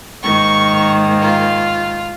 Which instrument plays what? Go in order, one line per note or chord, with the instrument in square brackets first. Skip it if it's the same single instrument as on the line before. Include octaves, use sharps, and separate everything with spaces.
[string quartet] G#2 D#3 A#3 [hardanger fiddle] C#6
[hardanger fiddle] F4